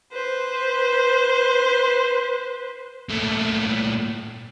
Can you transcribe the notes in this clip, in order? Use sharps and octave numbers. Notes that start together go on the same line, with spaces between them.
B4 C5
A#2 A3